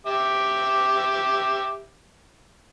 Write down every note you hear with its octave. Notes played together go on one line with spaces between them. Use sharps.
G4 E5 D6